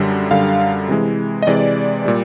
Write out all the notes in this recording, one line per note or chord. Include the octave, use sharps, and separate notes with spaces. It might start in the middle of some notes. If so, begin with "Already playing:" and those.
Already playing: F#2 D3 G3
F#2 D3 G3 F5
C3 E3 G#3
D#5
C3 E3 G#3 D5
A#2 G3